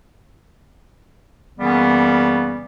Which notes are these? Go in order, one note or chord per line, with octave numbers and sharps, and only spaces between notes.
F#2 C#3 E3 G3 A#3 B3